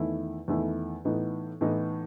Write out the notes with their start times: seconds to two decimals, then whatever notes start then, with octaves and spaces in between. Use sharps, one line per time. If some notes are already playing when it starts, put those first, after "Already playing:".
Already playing: E2 D#3 A3 E4
0.48 E2 D#3 A3 E4
1.05 A2 E3 B3 D#4
1.61 A2 E3 B3 D#4